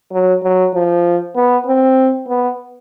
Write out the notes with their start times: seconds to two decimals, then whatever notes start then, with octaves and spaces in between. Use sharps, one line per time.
0.12 F#3
0.43 F#3
0.74 F3
1.36 B3
1.66 C4
2.28 B3